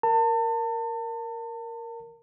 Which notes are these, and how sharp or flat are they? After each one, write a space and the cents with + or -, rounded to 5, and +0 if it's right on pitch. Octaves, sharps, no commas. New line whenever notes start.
A#4 +0 A5 +35